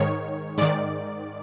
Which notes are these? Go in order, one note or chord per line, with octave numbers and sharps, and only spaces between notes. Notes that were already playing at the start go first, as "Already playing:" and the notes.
Already playing: G#2 D#3 C#5
G#2 D#3 D5